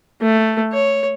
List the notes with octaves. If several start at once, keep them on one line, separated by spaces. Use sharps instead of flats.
A3
C#5